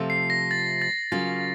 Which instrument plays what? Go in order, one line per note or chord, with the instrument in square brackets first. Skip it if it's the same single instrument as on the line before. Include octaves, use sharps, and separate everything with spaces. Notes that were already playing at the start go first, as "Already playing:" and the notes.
Already playing: [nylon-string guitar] C3 F3 A3 C4 F4
[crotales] C7
A#6
A6
A6
[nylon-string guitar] C#3 F#3 A#3 C#4 F4 [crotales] A6